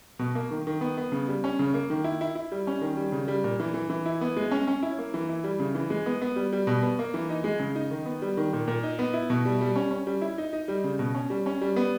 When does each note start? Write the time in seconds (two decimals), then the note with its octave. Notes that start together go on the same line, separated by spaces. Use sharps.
0.19 B2
0.35 A#3
0.51 D#3
0.67 D#3
0.81 B3
0.98 B3
1.12 C#3
1.28 G3
1.44 C#4
1.59 C#3
1.74 A#3
1.90 D#3
2.04 E4
2.21 E4
2.35 E4
2.52 G3
2.67 C#4
2.81 D#3
2.97 G3
3.12 C#3
3.28 G3
3.44 A#2
3.60 E3
3.74 E3
3.90 E3
4.06 E4
4.21 B3
4.37 G#3
4.51 C#4
4.68 C#4
4.83 E4
4.98 A#3
5.14 E3
5.29 E4
5.44 G3
5.60 C#3
5.75 E3
5.90 G#3
6.06 B3
6.22 B3
6.36 G3
6.53 G3
6.67 B2
6.82 B3
6.99 A#3
7.14 E3
7.30 D#4
7.44 G#3
7.59 C#3
7.75 D#4
7.91 D#3
8.06 B3
8.22 G3
8.37 D#3
8.53 A#2
8.68 A#2
8.83 D#4
8.99 B3
9.14 E4
9.30 B2
9.45 G3
9.61 G3
9.76 C#4
9.91 C#4
10.07 G3
10.21 E4
10.38 D#4
10.53 D#4
10.68 G3
10.84 C#3
10.99 B2
11.15 C#4
11.30 G3
11.46 C#4
11.61 G3
11.76 B3